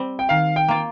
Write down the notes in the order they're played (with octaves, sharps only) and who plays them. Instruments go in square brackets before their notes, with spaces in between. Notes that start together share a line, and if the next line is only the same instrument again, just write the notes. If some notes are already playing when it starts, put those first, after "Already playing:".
Already playing: [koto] G3 C4
[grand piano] G5
[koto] D#3 [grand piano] F5
[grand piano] G5
[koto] A#3 F4